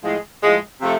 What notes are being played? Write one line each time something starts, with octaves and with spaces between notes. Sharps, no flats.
A2 F3 G#3
A2 F3 G#3
C3 F3 A3